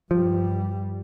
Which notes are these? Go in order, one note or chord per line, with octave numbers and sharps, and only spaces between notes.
G2 F3 G3